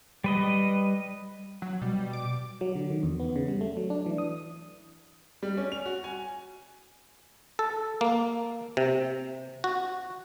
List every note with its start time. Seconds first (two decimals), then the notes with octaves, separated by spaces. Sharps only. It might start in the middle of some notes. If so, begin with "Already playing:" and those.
0.24 G3 B4 D#5
1.62 F#3
1.82 B2 G3
2.13 D6
2.61 F#3
2.75 D3
2.90 D#3
3.03 E2
3.20 B3
3.36 C#3
3.48 G3
3.61 A3
3.77 F#3
3.90 D4
4.06 E3
4.18 D#6
5.43 G3
5.57 C#4
5.72 F7
5.86 F#4
6.04 G#5
7.59 A4
8.01 A#3
8.77 C3
9.64 F#4